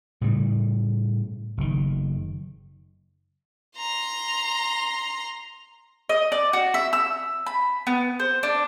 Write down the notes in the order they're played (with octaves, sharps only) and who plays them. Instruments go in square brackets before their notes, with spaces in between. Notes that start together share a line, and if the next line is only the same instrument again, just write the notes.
[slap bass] A2 C#3 G3
F#1 D#3
[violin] A#5 C6
[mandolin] D#5
D5
F#4
E5
E6
B5
B3
C5
D4